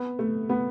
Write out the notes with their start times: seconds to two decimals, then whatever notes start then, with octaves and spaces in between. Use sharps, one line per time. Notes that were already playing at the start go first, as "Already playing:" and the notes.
Already playing: B3
0.19 A3
0.49 B3